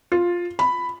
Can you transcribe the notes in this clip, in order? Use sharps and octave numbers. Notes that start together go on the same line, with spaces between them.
F4
B5